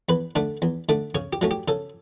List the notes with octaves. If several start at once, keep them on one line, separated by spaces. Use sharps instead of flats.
E2 B4
D3 A3 D4
E2
D3 A3 D4
C#3 C#5
G4
F#3 A3 C#4
G4
C#3 A4